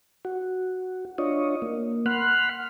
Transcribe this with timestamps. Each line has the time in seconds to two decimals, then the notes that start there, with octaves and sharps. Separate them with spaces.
0.25 F#4
1.18 D4 F4 C#5 D#5
1.62 A#3
2.06 F#5 B5 C6 F6 F#6